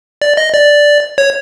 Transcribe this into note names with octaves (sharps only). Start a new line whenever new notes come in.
D5
D#5
D5
C#5